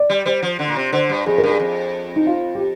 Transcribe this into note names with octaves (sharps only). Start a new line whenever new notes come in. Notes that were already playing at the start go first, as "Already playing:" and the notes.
Already playing: D5
G3
G3 C5
F3
D3
A#2
C3
D3 C5
G2
F2 G#4
A#4
G2
G#4
F2
D#4
F4
G4